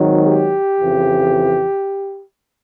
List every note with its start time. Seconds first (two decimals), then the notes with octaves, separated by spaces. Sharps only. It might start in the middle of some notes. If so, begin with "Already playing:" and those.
Already playing: G#1 G#2 D#3 F#3
0.24 G4
0.80 F2 C#3 E3